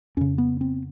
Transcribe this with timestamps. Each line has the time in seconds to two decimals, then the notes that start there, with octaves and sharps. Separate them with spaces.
0.17 F2 C#3 C#4
0.38 B3
0.61 C4